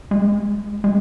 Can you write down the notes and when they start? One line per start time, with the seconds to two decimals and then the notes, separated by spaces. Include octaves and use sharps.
0.11 G#3
0.84 G#3